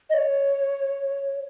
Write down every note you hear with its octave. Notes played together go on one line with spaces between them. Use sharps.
D#5
C#5